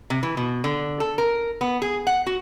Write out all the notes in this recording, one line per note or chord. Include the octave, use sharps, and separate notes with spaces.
C3
E3
B2
D3
A4
A#4
B3
G#4
F#5
F#4